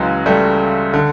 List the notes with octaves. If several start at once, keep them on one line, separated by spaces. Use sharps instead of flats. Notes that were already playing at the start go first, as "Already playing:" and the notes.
Already playing: C#2 C#3 E3 F#3 G#3
G3 A3
D3